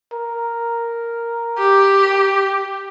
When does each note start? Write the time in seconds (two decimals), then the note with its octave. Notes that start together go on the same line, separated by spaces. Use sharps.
0.12 A#4
1.58 G4